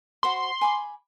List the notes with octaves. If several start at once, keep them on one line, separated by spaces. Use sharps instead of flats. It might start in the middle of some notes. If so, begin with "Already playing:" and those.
F#4 C5 B5 C6
G#5 B5 D6